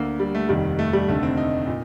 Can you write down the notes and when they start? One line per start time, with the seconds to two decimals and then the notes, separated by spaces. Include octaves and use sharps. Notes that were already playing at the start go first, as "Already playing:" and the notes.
Already playing: D2 D3 A#3
0.20 G3
0.35 A3
0.49 F1 D#2 D#3 G3
0.79 A3
0.93 G3
1.08 F1 D#2 D3 A3
1.23 C4
1.37 D#4
1.67 A#2